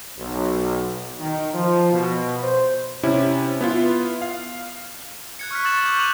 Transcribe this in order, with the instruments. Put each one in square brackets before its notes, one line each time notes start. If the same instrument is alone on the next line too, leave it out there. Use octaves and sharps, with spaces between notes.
[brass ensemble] B1
D#3
F3
B2
C5
[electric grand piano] C3 C#4 E4
B3 E4 F4
F5
[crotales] F#6 G#6 C#7
C#6 F6 F#6 B6
C#6 E6 A6 E7 F#7
C#6 D6 G6 G#6 F#7
F#6 D#7 F7 F#7